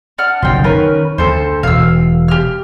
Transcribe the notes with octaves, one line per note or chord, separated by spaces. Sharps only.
D4 F#5 F6
F#1 B1 F#2 F4 G5
D#3 C#4 A#4 B4
D2 A4 C5
E1 F5 E6
G4 F6